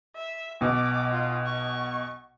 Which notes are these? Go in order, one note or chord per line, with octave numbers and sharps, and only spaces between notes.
E5
B1 B2 D6
F4
C#6